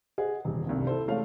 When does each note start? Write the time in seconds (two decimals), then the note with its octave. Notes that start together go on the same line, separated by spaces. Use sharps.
0.18 G#4 C5 D#5 F#5
0.45 D#1 E2
0.67 F1 C2 G2
0.87 E4 A4 C5
1.07 E3 G#3 A3 C#4 F5